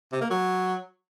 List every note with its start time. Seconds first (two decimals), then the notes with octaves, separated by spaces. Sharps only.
0.12 C3
0.21 A#3
0.30 F#3